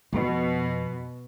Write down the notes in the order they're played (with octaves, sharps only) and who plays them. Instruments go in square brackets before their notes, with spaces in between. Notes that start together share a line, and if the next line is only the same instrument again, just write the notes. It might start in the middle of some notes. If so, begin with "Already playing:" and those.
[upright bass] F2 [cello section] B2